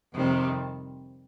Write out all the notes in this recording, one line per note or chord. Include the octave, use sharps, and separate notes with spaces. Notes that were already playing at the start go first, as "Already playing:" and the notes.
F2 C3 D#3 G3 C4